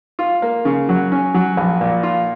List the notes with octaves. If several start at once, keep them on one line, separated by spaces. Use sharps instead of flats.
F4
A#3
C#3
F#3
C#4
F#3
A#1
A#2
F4